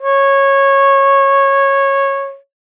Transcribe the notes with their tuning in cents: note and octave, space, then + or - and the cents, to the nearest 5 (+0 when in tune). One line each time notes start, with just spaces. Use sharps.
C#5 -15